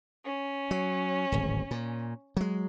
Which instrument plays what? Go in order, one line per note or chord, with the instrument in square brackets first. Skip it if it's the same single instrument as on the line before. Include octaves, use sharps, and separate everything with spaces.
[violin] C#4
[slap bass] F#3
D1 G#1
A#2
F#3 G#3